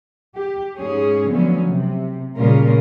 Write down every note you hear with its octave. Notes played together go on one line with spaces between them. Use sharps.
G4
G#2 G#3 C#4 G#4 C#5
D3 F3 F#3 A3 B3 C#4
C3
A#2 C#3 G3 C#4 F4 A#4